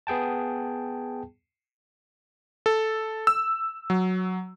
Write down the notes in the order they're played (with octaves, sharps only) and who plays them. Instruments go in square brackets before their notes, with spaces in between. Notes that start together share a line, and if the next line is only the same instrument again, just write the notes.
[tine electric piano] B3 G#4 G5 A5
[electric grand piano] A4
E6
F#3